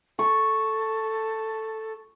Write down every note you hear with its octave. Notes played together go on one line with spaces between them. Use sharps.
A4 C#6